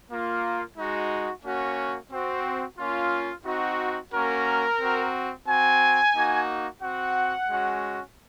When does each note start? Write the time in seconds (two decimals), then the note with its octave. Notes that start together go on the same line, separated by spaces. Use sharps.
0.10 A#3 F4
0.77 G#3 D#4 F#4
1.44 A#3 C#4 F#4
2.11 C4 F#4
2.78 A#3 C#4 F4
3.45 C4 D#4 F#4
4.12 A#3 C#4 F#4 A#4
4.80 C4 F#4
5.46 C4 F#4 G#5
6.14 A#3 D#4 F#4
6.80 C4 F#4 F#5
7.47 G#3 C#4 F#4